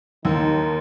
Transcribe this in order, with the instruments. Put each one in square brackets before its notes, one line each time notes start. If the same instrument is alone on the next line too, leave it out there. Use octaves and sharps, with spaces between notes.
[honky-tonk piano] D#2 [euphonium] D#3